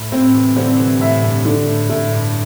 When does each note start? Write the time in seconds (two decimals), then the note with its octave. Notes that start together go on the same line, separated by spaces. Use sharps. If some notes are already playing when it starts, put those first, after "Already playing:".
Already playing: A2
0.12 A2 C4
0.34 C3 E3
0.56 D3 G3 C4
0.68 D3
0.78 C3 E3
1.01 A2 E5
1.23 G2 C3
1.45 D3
1.67 A2
1.89 A2 A3
2.12 G2